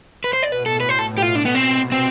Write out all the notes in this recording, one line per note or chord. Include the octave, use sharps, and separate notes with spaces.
B2 B4
C5
D5
A2 B4
A4
B4
C5
A4
B2
G4
F4
B2 D4
B3
C4
C3
C4